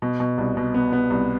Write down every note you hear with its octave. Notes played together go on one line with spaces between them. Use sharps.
B2
B2
C2
B2
B3
B3
C2